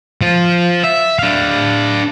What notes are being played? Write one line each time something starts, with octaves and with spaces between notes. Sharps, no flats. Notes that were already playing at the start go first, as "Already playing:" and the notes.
F3
E5
D4 F5